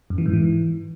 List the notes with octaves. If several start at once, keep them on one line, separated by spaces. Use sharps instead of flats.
F#2
E3
G#2
E3